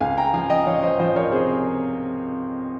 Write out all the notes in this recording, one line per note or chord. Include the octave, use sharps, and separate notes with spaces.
C#2 F5 G#5
G5 A#5
F3 F5 G#5
D#5 G5
F3 C#5 F5
C5 D#5
F3 C5 D#5
A#4 C#5
C3 G#4 C5